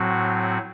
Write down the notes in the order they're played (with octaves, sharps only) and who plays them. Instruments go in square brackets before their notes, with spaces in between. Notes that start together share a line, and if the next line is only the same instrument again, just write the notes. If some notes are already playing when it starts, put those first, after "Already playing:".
Already playing: [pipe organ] A2 F#3 C4 F#4